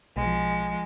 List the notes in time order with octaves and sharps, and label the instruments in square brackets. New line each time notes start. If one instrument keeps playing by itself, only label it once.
[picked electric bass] B1 [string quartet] F3 G#3